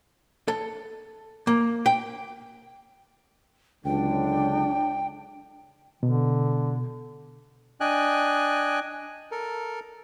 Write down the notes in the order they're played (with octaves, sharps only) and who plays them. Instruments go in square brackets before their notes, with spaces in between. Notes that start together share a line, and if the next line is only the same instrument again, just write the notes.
[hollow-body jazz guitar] A4
A#3
G5
[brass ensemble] C#2 D3 F#3 [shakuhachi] D4 [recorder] G5
[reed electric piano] B2 [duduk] D3
[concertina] D4 D#5 G5 G#5 F#6
A4 A#4